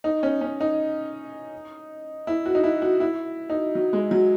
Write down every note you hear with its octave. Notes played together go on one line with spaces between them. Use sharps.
D#4
C#4
C#4
D#4
E4
F#4
D#4
E4
F#4
E4
D#4
F#3
G#3
F#3